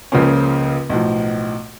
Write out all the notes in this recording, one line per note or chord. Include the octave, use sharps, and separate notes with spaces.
C#2 C#3 F3 A#3 C#4
B1 A2 F3